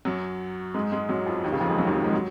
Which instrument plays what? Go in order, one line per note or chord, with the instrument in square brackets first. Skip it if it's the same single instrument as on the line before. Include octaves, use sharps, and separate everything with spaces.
[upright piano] F#2 F#3
G#2 G#3
G#2 G#3
F#2 F#3
F2 F3
D#2 D#3
C#2 C#3
F2 F3
G#2 G#3
F#2 F#3
D#2 D#3
F#2 F#3
G#2 G#3
F#3